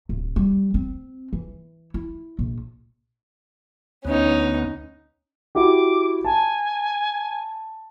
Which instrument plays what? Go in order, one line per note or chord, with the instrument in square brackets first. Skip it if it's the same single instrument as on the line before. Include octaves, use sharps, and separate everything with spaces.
[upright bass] D1
G3
C4
E3
E4
A#1
[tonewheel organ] D2 B3 [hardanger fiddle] C#4 D#4
[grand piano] E4 F#4 G4 [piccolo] D6
[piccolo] G#5 [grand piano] A5